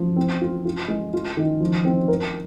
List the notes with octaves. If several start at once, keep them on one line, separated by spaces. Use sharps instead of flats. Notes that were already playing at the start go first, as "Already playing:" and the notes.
Already playing: F3
C4
F4
F4
G#3
F4
D#3
F3
C4
A#4